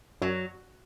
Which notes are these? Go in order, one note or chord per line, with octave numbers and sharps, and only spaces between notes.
F#2 F#3